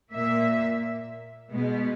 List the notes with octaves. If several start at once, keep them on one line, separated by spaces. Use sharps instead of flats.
A#2 A#3 E5
B2 G#3 B3